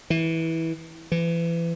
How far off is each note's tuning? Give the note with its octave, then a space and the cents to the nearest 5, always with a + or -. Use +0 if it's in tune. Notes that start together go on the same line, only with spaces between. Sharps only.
E3 -15
E3 +30